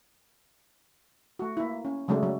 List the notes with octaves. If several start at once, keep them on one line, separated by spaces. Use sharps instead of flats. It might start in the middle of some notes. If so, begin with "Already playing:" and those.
A3 F#4
A#3 E4
C#4
C#3 F#3 G#3 A3 C#4 D4
F#3